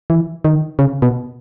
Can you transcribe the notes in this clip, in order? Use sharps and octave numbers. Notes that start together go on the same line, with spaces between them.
E3
D#3
C#3
B2